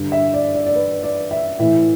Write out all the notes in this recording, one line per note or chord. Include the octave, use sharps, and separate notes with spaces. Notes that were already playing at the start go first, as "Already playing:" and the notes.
Already playing: G2 D3
E5
D5
D5
D5
B4
D5
E5
A2 E3 E5